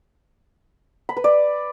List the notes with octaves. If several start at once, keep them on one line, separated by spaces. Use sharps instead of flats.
B5
B4
D5